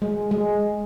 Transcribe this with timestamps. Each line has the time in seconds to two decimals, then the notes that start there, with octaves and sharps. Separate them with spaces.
0.02 G#3
0.31 G#3